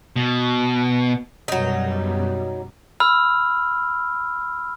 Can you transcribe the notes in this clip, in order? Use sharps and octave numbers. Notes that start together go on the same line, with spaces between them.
B2
F#2 B2 F#3 G3 D#4
B5 E6 F6